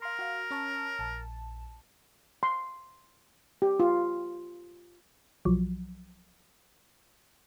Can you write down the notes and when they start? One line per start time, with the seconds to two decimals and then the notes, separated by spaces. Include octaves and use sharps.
0.02 A#4 F5 C6
0.19 F#4 F5
0.51 C#4 C#5 A5
0.99 A#1 A5
2.43 C6
3.62 G4
3.80 F4
5.45 B1 F3 F#3